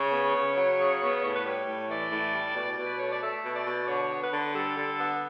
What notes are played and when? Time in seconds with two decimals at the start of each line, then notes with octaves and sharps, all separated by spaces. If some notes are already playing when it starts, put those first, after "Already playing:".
Already playing: C#3 C#5
0.12 B3
0.35 C#3
0.57 F#3
0.79 C#3
1.02 B3
1.23 A2 C#5
1.35 B4
1.45 G3 C#5
1.67 A2
1.89 E3 D5
2.12 A2
2.34 G3
2.56 B2 D5
2.78 B2
2.87 B4
2.99 A3 C#5
3.10 D5
3.22 A3 E5
3.44 B2
3.56 D5
3.66 B2
3.88 D3 C#5
4.10 B3
4.22 B4
4.32 D3
4.55 G3 A4
4.78 D3
4.99 B3